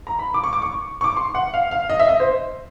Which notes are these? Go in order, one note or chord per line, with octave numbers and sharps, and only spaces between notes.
A#5
B5
D6
C#6
D6
C#6
C#6
D6
C6
F#5
F5
F5
D#5
E5
D#5
C5